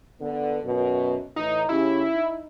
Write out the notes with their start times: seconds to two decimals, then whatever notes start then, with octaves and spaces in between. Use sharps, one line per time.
0.21 D3 B3
0.64 F#2 B2
1.36 A2 E3 D#4
1.69 C#3 C#4 E4 G4
2.13 D#4